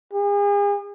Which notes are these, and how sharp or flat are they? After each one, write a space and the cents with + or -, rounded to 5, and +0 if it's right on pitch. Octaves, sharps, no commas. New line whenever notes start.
G#4 -40